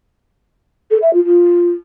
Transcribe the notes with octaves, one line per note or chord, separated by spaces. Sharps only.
A4
E5
F4
F4